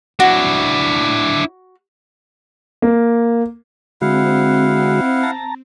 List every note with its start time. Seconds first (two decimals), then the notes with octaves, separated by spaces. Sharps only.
0.20 D4 E4 F#4
2.82 A#3
4.02 D3 G#3 C4 E4 F#4 F5 F#5
5.23 A5 A#5